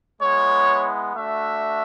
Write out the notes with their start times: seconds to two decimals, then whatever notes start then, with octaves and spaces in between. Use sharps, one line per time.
0.21 G#3 B3 E4 C#5
1.14 A3 D4 F#4 E5